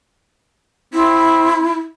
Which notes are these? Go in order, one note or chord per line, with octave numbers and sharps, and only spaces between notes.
C4 E4